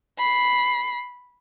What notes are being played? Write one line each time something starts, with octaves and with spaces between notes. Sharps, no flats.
B5 C7